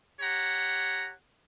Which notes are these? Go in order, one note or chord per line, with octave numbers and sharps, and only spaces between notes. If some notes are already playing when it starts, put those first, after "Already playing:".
G4 C#5 F#5 A#5